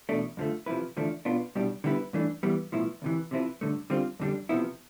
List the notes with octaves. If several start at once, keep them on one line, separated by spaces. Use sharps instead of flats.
E2 B2 A3 D4
F2 D3 F3 A3
C3 F3 A3 E4 B4
E2 D3 F3 A3 D4
B2 B3 D4 F4
C2 B2 G3 D4
D3 G3 B3 E4 B4
G2 E3 A3 D4
E3 G3 B3
B1 A2 F3 B3 E4
D2 C3 E3
C3 F3 C4 E4 B4
G2 D3 A3
D3 G3 C4 F4
F2 D3 G3 D4
C3 F3 B3 E4